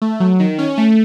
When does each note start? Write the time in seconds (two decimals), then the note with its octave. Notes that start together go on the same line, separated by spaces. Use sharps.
0.02 A3
0.20 F#3
0.40 D#3
0.59 C#4
0.78 A3